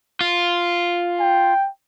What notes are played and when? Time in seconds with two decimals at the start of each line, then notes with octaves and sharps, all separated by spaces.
0.21 F4
1.20 G5